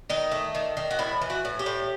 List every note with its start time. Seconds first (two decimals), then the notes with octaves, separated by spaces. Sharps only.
0.10 D#3 D#4
0.32 A3
0.55 D#3
0.77 D#3
0.91 F#4
0.99 A2 E4
1.21 E3
1.30 F#4
1.45 A2
1.59 G4
1.66 A2